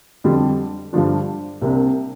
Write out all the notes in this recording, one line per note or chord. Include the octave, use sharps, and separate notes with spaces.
F2 D3 G3
G2 D3 F3 D4
C2 C3 A#3 D4